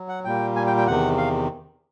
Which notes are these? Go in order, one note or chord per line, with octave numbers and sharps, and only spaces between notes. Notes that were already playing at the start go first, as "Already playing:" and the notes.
Already playing: F#3
F#5
A#2 G3 A#3 G5
G#5
G5
G5
E2 C3 D#3 F#5
F5